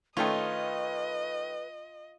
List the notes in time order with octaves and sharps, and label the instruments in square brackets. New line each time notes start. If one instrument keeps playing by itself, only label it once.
[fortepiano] D#3 A3 C#4 [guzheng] F4 [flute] B4 [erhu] D#5